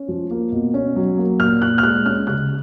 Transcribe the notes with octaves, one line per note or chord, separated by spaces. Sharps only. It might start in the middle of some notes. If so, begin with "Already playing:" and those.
Already playing: C#4
F3
A#3
B2
C#4
F#3
A#3
A#2 F6
A#2 F#6
F6
G#3 F#6
C#4 F6
C#3 F#6